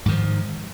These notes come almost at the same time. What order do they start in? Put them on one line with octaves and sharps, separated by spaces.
G#2 D#3 F3